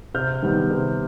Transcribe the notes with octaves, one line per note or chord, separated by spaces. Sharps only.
C3 F6 G6
D#3 G3 B3
C3